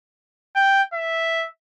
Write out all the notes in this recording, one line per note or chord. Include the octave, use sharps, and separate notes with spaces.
G5
E5